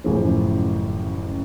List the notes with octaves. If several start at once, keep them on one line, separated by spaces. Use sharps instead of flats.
A1 F#2 C#3 E3 F3